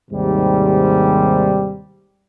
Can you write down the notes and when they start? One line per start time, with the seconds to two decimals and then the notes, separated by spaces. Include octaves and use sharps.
0.10 D#2 G#2 C3 G3